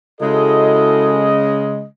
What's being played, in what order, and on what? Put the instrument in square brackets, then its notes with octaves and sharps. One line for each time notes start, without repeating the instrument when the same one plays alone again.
[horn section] C#3 G#3 D#5 [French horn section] E4 F#4 A4